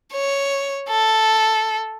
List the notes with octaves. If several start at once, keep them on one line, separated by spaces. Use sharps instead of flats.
C#5
A4